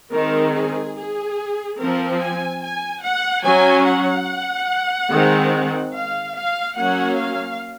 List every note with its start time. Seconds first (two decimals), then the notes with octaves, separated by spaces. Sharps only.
0.12 D#3 G#3 C4 A#4
0.54 G#4
0.95 G#4
1.78 F3 C4 A#4
2.20 G#5
2.61 G#5
3.03 F#5
3.44 F#3 C#4 G#5
3.86 F#5
5.10 D#3 G#3 C4
5.93 F5
6.36 F5
6.77 F#3 A#3 C#4 F#5
7.18 F5